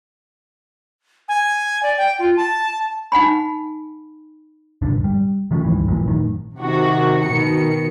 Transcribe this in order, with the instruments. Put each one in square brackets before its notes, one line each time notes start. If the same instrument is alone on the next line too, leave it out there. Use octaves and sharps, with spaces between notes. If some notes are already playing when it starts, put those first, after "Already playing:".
[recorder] G#5
D5
G5
F4
A5
[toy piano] D#4 F#5 G#5 B5
[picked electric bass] D1 G1 C2 D4
G3
D#3 F3 A3 C#4
C#2 G2 D#3 E3
A#1 F#2 A#2 E3
F#2 A2 D#3
[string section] C3 D#3 F#4
B2 D#3 C#7